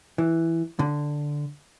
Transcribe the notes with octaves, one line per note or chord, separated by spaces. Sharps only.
E3
D3